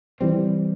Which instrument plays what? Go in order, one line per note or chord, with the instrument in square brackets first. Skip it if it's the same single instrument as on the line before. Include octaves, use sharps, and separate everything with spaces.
[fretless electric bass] E3 G3 C4